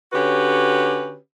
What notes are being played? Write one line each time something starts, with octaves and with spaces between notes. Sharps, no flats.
D3 C#4 F#4 G4 B4 C#5